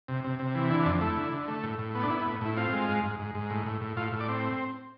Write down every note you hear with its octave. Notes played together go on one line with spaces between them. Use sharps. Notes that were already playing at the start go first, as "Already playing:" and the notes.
C3
C3
C3
E3
D3 E4
F2 D4
A3 E4
D3
D3
A3
A2
A2
B3
D4
B3 E4
E4
A2
A2 E4
C4 F4
G#3
G#2
G#2
G#2
G#2
A2
A2
A2
A2 F4
A2
D5
C4